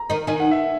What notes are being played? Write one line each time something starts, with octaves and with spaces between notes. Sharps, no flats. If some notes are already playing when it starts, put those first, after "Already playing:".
Already playing: A#5
D#3 D#4
D#3 D#4 G#5
F#5
E5